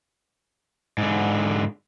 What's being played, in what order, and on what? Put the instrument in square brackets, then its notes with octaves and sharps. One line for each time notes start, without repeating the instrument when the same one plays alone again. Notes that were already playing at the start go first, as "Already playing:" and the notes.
[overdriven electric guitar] G#2 D3